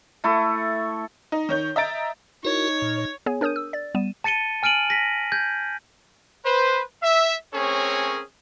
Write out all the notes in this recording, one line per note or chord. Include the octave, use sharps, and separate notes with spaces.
A3 E4 A4
D#4
D#3 C#5 G6
D#5 E5 A#5 A6 D7
D#4 E4 F#4 A#4 C#5
A#2
B3 G#4 C#5 G#5
D4 A#4 C#5 D#6 G6 D#7
E6
D5 A6
G3 B3 D#7 E7
A5 A6 C#7 D#7 G7
G#5 F6 D7 D#7 F#7
A#6 B6
G6 G#6
B4 C5
E5
A3 C4 C#4 G#4 A#4 C#5